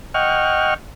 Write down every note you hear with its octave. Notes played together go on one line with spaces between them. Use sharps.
D#5 F#5 G5 C#6 F6